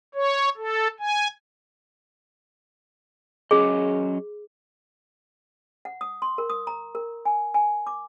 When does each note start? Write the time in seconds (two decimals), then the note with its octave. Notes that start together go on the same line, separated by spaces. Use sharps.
0.15 C#5
0.57 A4
1.00 G#5
3.51 F#3 C#4 G#4 D#5
5.85 F#5
6.01 D#6
6.22 C6
6.38 A#4
6.50 D#6
6.67 A#5
6.95 A#4
7.25 G#5
7.54 G#5
7.87 D6